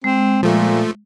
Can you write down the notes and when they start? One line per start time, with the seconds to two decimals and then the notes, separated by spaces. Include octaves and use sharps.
0.04 G#3 C4
0.43 A#2 F3 A3